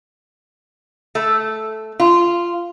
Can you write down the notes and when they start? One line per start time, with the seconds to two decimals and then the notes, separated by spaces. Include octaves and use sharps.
1.15 A3
2.00 F4